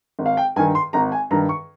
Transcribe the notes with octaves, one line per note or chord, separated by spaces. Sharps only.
G#1
F5
G5
G2 D#3 G#5
C6
G#1 A#5
G#5
G2 D#3 A#5
C#6